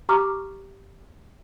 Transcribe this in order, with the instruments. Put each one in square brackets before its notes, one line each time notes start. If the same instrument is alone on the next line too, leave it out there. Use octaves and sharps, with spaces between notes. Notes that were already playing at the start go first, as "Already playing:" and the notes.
[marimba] G4 A#5 C#6 D6 F6